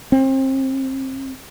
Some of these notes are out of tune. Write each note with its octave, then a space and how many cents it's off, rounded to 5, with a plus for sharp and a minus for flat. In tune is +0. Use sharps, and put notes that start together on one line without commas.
C4 +30